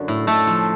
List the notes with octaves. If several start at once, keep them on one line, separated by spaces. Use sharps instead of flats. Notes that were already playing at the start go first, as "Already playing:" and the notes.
Already playing: F#2 D3 F#3
A2
A2 A3 A4
F3